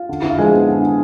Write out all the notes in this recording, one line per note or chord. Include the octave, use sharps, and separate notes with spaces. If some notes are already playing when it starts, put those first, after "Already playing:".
Already playing: F4
D3
D3 E4
F4
F3 G#3 G#4
B3
D3
D3